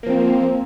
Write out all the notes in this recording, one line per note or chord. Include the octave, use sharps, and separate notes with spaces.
F3 A#3 C4